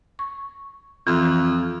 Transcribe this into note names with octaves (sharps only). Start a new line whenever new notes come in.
C#6
F2 E3